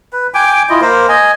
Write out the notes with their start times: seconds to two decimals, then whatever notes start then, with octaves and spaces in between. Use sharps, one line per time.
0.13 B4
0.34 G5 G#5 D6
0.69 E4 F4 D#5
0.81 A#3 A#4 C5
1.08 D#5 G#5